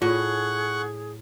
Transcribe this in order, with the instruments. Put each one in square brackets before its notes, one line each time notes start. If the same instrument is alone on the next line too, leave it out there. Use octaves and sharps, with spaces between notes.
[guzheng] A2 [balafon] F4 [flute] G#4 [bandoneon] F#5 C#6